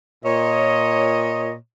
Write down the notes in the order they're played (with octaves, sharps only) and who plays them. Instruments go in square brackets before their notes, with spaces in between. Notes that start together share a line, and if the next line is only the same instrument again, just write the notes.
[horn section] A#2 C#5 D#5